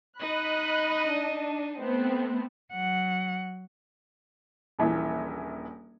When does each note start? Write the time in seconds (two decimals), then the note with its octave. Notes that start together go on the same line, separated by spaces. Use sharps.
0.19 D#4 D#5 B5 F#6
1.10 D4
1.79 A3 B3 C4
2.73 F#3 F#5
4.79 D#1 A#1 E3